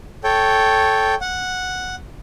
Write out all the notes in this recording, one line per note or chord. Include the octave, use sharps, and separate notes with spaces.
A4 C#5 G5
F#5